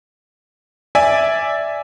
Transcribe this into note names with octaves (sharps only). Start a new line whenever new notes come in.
D5 E5 G#5